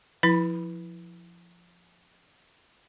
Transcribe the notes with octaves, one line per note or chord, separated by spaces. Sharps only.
F3 E4 B5